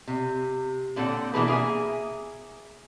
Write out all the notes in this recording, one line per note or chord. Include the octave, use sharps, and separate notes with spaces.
C3
A#2 D3 C4 A4 C#5 F#5
B2 E3 A#3 D4 G#4 B4
A#3 G#4 E5 G#5